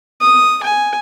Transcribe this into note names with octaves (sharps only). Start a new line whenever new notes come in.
D#6
G#5